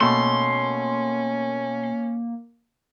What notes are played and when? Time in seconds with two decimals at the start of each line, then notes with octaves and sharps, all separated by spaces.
0.01 B2 A3 A#3 C#4 C6